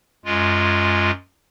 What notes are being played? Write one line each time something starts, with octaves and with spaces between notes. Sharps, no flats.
F#2 G#3 F4